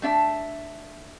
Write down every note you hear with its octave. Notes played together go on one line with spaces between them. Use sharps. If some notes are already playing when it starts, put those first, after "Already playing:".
A3 D4 E5 A5